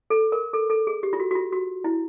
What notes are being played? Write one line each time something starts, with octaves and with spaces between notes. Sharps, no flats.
A4
A#4
A4
A4
G#4
G4
F4
F#4
F#4
F4
F#4
E4